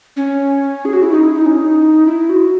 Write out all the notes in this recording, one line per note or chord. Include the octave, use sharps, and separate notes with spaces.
C#4
G#4
F#4
E4
D#4
E4
D#4
C#4
D#4
E4
F#4